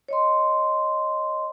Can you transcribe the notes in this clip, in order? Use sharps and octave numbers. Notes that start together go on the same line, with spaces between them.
C#5 D#5 C6